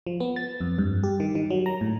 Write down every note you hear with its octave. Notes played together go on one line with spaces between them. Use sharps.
F3
B3
A6
F2
G2
G4
D#3
D#3
F#3
A#5
A2